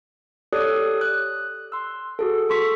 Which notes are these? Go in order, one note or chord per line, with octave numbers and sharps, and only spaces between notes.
G4 A4 C#5 D5 D#6 F#6
F#6
C6 E6
F#4 G#4 A4
A4 C6 C#6 B6